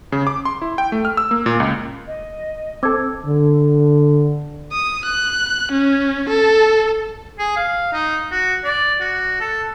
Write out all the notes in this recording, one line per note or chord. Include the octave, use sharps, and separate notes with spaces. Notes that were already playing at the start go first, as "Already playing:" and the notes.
C#3
D6
C6
E4
G5
A3
F6
E6
A#3
A#2
C#2
D#5
C4 A4 D6 E6 G#6
D3
D#6
F#6
C#4
A4
G#4
F5
D#4
F#4
D5
F#4
A4